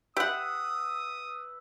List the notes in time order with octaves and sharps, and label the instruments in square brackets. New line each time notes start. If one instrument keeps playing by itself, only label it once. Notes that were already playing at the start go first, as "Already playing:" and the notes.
[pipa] G4 F#5 [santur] B4 E5 [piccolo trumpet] D#6